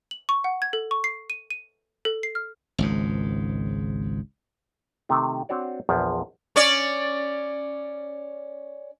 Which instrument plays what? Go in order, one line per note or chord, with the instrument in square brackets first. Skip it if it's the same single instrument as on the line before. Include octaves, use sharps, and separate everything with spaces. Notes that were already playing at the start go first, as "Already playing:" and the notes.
[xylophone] F#7
C#6
F#5
G#6
A4
C#6
C7
D#7
D#7
A4
C7
F6
[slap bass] G#1 C#2 G#2
[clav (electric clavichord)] C3 D#3 A3
C4 D4 F#4 C#5 D5
A#1 E2 F3
[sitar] C#4 C#5 D5